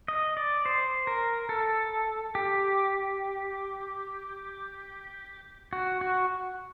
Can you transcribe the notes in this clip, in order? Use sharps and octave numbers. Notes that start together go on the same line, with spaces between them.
D#5
D5
C5
A#4
A4
G4
F#4
F#4